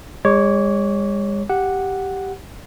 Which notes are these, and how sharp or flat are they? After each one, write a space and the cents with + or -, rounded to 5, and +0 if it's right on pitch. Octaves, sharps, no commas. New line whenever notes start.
G#3 -45 C#5 -10 D6 -30
G4 -5 F#5 -5